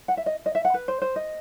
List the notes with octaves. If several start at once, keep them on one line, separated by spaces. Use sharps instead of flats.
F#5
E5
D#5
D#5
E5
F#5
B4
C5
C5
D#5